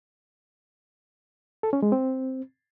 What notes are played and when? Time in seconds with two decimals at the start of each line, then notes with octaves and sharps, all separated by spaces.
1.63 A4
1.73 C#4
1.82 G#3
1.92 C4